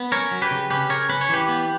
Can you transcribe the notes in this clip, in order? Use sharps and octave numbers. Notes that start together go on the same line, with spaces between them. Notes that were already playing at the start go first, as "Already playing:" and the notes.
Already playing: B3
C#4 A#4 C#5
F#3
G4 B4
C#3
C#4 G4 B4
C#3 A#4 C#5
C#4 B4
C#5
E3 G4 B4
B3